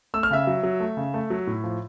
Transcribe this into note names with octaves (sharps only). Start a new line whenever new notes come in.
A3 E6
F6
C#3 E5 E6
F#3
F#3
A3
C#3
A3
F#3
A2
F3